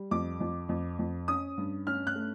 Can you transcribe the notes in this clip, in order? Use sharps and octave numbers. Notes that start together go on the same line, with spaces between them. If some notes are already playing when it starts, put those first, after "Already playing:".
Already playing: G3
F2 D6
F2
F2
F2
C#4 D#6
G2
C#4 F6
F#6
A3